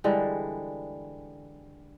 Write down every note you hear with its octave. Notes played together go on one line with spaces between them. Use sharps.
D3 E3 G3 G#3